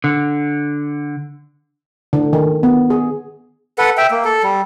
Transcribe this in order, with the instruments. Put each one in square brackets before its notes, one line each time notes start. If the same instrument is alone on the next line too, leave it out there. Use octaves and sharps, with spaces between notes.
[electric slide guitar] D3
[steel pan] D3
D#3
B3
G#4
[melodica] A4 B4 F#5
E5 G5
A#3
A4
G3